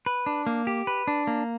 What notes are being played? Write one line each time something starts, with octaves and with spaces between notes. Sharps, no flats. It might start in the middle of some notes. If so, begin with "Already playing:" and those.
B4
D4
A#3
G4
B4
D4
A#3